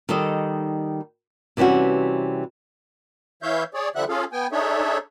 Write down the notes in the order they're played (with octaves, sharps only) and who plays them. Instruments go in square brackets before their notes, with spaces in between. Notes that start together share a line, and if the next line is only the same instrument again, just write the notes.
[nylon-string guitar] D#3 G3 D#4 A4 D#5
C3 E3 G3 C#4 F#4
[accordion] E3 C#5 E5 F5 G6
G#4 C#5 D5
D3 F3 G3 E5 F#5 F#6
C#4 F4 G#4 A4 F5
B3 G5 G#5
D4 D#4 G#4 A4 C#5 E5